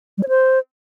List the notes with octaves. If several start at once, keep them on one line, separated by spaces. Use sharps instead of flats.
G3
C#5
C5